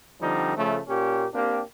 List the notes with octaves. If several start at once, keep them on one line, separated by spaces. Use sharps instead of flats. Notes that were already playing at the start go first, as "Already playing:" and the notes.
D3 F3 G3 C4 D#4
C#3 F3 A3
A#2 A#3 C#4 G4
A#3 C4 D4 G4